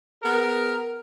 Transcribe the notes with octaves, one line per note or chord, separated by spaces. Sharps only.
B3 G#4 A#4